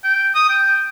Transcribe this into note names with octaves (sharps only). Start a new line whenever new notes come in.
G5
D#6
G5